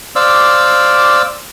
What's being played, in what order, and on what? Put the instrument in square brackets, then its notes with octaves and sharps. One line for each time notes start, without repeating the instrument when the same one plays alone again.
[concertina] C5 D5 F5 D6 E6